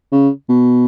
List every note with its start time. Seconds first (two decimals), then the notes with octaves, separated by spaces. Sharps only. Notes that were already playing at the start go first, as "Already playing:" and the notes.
0.12 C#3
0.49 B2